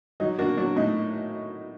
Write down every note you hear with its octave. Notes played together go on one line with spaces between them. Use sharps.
F#3 D#4
A#3 D4 F#4
F#3 D4
A2 D#4